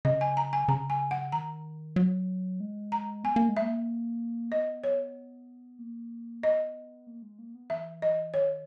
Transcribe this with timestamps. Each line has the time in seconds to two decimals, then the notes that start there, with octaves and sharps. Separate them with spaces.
0.05 C#3 D#5
0.21 G#5
0.37 A#5
0.53 G#5
0.68 C#3 A#5
0.90 G#5
1.11 F#5
1.32 D#3 A#5
1.96 F#3
2.60 G#3
2.92 A#5
3.24 B3 G#5
3.36 A#3
3.49 G#3
3.57 E5
3.62 A#3
4.51 B3 D#5
4.84 C#5
5.79 A#3
6.43 B3 D#5
7.07 A#3
7.23 G#3
7.39 A#3
7.55 B3
7.70 E3 E5
8.02 D#5
8.34 D#3 C#5